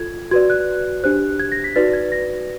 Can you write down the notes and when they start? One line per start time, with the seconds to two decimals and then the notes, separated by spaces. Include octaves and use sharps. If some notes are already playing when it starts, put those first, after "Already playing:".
Already playing: F4 A4 G#6
0.31 F#4 B4 D5 G#6
0.50 F#6
1.04 D4 G4 C5 F#6
1.40 G#6
1.52 A#6
1.64 B6
1.76 D#4 F#4 B4 D5 A6
1.93 G#6
2.12 A#6